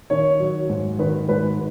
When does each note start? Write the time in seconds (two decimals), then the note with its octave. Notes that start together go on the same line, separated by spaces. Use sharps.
0.10 D#3 C#5
0.40 F#3
0.69 G#2
0.99 D#3 B4
1.29 G#2 B4